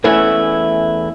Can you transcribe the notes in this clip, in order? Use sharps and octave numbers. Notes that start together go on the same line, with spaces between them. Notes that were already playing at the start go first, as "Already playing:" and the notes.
E2 E3 A3 C#4 E4 G#5